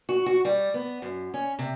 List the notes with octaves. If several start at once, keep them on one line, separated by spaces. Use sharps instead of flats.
F#4
F#4
G3
B3
F#2
C#4
C3